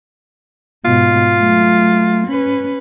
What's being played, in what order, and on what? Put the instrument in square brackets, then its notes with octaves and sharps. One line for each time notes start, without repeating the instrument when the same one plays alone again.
[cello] G#2 B2 [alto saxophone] F4
[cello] F#3 A3
C#4 B4